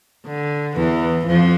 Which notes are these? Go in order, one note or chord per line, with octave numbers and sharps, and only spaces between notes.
D3
E2 E3
F2 F3